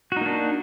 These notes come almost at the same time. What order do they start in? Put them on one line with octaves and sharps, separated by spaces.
F#4 D#4 A#3 D4